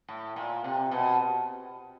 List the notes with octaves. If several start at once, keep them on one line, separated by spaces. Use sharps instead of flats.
A2
A#2
C3
B2